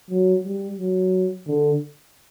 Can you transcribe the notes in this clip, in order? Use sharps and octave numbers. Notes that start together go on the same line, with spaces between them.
F#3
G3
F#3
D3